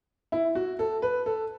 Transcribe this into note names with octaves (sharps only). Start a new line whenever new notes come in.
E4
F#4
A4
B4
A4